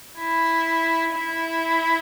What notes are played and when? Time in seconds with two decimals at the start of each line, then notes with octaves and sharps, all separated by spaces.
0.18 E4
1.14 E4